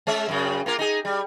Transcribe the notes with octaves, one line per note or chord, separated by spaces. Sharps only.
G#3 C#4 E5
F#2 C#3
A#3 F4 A#4
D#4 G#4
G3